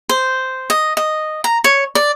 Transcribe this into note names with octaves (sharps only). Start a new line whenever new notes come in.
C5
D#5
D#5
A#5
C#5
D5